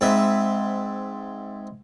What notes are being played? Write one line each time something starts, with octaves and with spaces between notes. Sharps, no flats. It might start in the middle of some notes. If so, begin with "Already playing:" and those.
G#2 C4 B4 E5